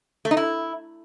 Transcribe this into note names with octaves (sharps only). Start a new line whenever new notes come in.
A3
D#4
E4